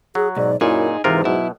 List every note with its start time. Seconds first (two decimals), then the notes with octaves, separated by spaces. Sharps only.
0.15 F#3 G#4
0.37 B1 G#2 D5
0.61 F#2 A#2 D#4 E4 G#4
1.04 G#2 C3 E3 F4 A#4
1.25 B2 F#3 E4